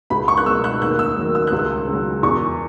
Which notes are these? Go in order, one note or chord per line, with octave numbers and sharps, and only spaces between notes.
C#2 B5
C#6
F#6
B2 F#3 E6
F#6
D#2 F#6
E6
D#3 F#3
E6
C#2 F#6
E6
C#3
F#3
E2 C#6